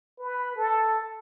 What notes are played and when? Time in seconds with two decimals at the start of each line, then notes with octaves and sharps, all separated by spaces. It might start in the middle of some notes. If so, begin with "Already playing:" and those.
0.19 B4
0.56 A4